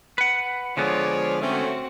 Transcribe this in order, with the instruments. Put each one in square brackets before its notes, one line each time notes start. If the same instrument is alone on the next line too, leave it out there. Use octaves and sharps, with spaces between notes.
[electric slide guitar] B4 F#5
[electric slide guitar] D3 G#3 B3 [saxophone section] F3 G#4 [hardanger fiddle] C#5 D5
[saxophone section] A3 C#4 [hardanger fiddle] C4 F#4